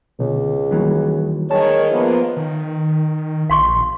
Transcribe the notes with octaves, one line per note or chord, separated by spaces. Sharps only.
C#2 B2 D3
D#3 E3 F#3 G3 A#3
D#3 G#3 C#5 A5
F3 A#3 B3 B4 E5
D#3
A#1 F5 C6 C#6